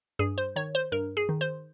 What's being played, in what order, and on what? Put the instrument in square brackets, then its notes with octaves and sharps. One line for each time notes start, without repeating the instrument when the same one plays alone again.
[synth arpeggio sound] G2 G#4
C5
D#3 C#5
C5
G2 A#4
G#4
D#3
C5